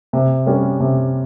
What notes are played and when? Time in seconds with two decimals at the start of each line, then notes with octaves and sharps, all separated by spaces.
0.13 C3
0.46 G3 C#4
0.80 C3